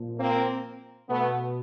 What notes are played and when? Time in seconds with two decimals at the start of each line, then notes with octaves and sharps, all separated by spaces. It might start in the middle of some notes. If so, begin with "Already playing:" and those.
Already playing: A#2 F3
0.18 A#3 C4
1.09 B2 A3 B3